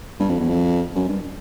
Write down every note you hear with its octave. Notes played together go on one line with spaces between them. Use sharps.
G2
F2
E2
F2
F#2
G2